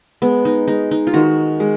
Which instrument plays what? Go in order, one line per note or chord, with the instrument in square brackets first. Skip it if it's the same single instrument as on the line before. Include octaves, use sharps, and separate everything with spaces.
[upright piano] G#3 [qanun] B3
[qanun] D#4
[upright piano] G#3 [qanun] D#4
[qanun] D#4
F4
[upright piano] D#3 [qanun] F#4
[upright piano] G#3